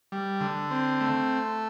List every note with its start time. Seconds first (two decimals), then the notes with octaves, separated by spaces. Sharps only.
0.12 G3
0.41 D3
0.71 C4
1.01 A3